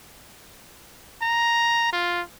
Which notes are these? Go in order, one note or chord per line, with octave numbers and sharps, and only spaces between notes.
A#5
F4